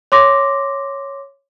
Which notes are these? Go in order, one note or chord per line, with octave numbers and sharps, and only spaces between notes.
C#5 C6 D6 A#6